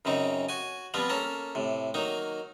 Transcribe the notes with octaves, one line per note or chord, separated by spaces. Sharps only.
F#2 C#3 C4 D#4
F#4 G#5
F3 G3 B3 C4 F4
A#3 C#4 A4 A#4
A2 C3
D#3 F#3 A#3 D#4